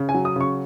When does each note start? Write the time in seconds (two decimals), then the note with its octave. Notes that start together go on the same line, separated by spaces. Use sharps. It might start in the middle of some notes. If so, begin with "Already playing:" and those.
Already playing: C#3
0.09 G#5
0.14 F#3
0.25 D#6
0.36 C#3 C#6